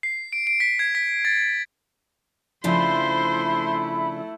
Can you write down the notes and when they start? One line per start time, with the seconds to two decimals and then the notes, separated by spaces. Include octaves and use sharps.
0.03 C7
0.33 D7
0.47 D7
0.60 B6
0.79 G#6
0.95 B6
1.25 A6
2.64 C#3 F3 A3 D4 E4 C5 B5 C6